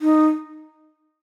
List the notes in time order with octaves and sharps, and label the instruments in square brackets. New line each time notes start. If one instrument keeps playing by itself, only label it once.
[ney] D#4